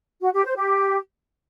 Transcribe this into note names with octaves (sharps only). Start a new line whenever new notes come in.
F#4
G4
C5
G4